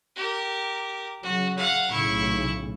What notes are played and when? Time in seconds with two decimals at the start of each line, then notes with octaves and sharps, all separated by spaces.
0.16 G4 A#4
1.23 C#3 F#3 F#4
1.57 F5 F#5
1.91 B1 A2 C#3 E4 C#6